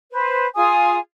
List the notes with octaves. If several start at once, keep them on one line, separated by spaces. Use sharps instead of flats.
B4 C5
F4 G#4 G#5 D#6